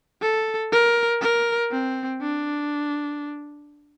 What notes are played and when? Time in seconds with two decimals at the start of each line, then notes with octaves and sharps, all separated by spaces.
0.22 A4
0.72 A#4
1.21 A#4
1.72 C4
2.22 D4